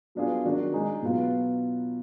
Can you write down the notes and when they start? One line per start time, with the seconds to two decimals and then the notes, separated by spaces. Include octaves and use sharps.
0.15 F#3 B3 D4 F4 G#4
0.45 D#3 F#3 D4 F#4
0.73 G#3 D#4 G#4
1.02 B2 F#3 B3 F4 B4